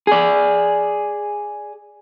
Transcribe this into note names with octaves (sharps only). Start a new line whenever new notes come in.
G#4 D5